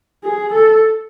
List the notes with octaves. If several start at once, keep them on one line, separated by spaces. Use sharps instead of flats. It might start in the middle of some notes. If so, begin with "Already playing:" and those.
G#4
A4